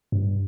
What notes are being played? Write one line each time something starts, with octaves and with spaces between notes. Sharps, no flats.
G2